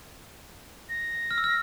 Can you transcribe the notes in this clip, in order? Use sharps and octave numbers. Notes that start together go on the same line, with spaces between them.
A#6
F6
E6
F6